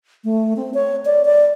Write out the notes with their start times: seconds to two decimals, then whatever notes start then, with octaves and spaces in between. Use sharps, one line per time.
0.24 A3
0.56 C4
0.74 C#5
1.05 D5
1.25 D5